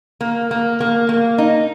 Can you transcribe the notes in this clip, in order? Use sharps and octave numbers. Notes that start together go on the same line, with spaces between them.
A#3
A#3
A#3
A#3
D#4